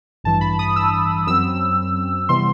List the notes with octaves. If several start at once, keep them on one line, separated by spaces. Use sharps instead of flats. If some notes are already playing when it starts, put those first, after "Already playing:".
A1 G2 E3 A5
B5
D#6
E6
F#2 F#3 C4 E6
C3 E3 G3 B3 C6